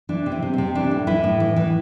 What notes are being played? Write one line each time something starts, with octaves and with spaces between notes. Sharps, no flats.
E3 D4
C3
C4
C3
C3 C4
E3 D4
A2
E3 E4
A2
E3
E3